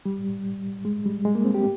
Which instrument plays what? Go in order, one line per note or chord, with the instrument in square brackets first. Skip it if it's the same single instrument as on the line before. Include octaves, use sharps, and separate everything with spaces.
[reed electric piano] G3
G#3
G3
G#3
A#3
C4
G4